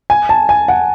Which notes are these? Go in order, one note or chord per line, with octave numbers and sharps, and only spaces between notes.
G#5
A5
G#5
F#5